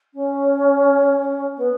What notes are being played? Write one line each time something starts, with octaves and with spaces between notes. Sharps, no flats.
C#4
B3